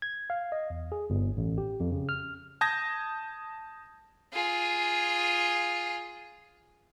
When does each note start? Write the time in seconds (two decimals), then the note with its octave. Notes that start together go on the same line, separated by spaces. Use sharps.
0.02 G#6
0.30 F5
0.52 D#5
0.70 E2
0.92 G#4
1.10 G1
1.37 A1
1.58 G4
1.80 F2
1.92 C#3
2.09 F6
2.61 A5 D#6 G6 G#6 A#6
4.33 F4 G#4